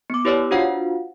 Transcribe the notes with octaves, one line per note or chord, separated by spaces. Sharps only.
B3 D6
E4 G4 B4 C#5 D5 E6
D4 F4 F#4 C5 F5 F#5